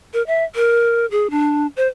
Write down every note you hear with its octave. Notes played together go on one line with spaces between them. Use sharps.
A#4
E5
A#4
G#4
D4
C5